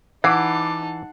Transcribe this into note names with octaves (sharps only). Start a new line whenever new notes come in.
E3 D#4 F#5 A5 B5 D6 C7